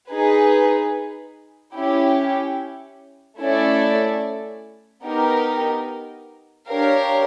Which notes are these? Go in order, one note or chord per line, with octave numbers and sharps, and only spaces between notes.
D#4 G#4 B4
C#4 E4 G4
A3 C#4 E4 A4 D5
B3 D#4 G4 A#4
D4 G4 A#4 C#5 F5